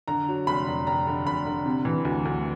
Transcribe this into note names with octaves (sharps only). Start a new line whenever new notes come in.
D3 A#5
F#3
F1 B5
F1
F1 A#5
D3
F1 B5
D3
C3
E3
D2
D2